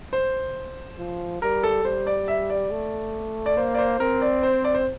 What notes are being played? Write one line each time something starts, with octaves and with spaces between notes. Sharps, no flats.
C5
F3
G3 A#4
A4
G3 C5
D5
E5
D5
A3
D5
A#3 C5
D5
C5
C4 A#4
D5
C5
D5
C5